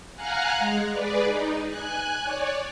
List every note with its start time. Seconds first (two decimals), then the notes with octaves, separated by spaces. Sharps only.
0.15 F5 F#5 G#5 A#5 F6 F#6
0.59 G#3
0.91 G#4 B4 D5
1.23 D#4
1.68 G#5 F#6
2.23 C#5 D5